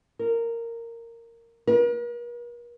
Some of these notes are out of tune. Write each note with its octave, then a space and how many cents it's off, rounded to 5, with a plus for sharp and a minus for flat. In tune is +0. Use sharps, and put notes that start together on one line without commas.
A#4 -10
A#4 +45